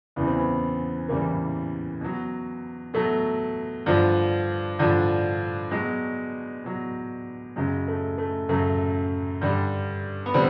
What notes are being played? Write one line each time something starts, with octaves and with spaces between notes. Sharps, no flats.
E2 C#3 E3 G3 B3
C4
B3
E2 C#3 E3 G3 A#3
B2 F#3
B2 F#3 A3
G2 D3 F3
G2 D3 F3
B2 F#3 G#3
B2 F#3
F#2 C#3 F#3 G#3
A3
A3
F#2 C#3 F#3 A3
G2 D3 G3
B3
D3 G3 C4